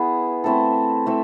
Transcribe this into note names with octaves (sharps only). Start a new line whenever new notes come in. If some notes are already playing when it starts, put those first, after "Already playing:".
Already playing: B3 E4 G#4
A3 C4 E4 A4
A3 C4 E4 A4